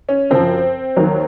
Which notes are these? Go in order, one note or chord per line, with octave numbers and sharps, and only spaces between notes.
C#4
F#2 C#3 F3 C4
D#2 D#3 F#3